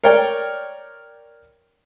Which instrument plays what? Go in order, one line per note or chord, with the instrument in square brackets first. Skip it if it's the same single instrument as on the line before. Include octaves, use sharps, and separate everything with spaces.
[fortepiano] A#4 C#5 D5 G5